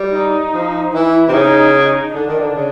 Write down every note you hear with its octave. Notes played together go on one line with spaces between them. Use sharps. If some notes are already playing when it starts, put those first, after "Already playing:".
Already playing: G3
D#4
F3
E3 E4
C3
C#3 D#4
D#4
D3 D4
D#3
D3
C#3